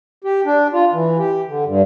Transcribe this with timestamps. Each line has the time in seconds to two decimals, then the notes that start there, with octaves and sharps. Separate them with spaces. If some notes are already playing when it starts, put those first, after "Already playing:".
0.24 G4
0.45 D4
0.73 F4
0.93 E3
1.18 G4
1.47 D3
1.65 G2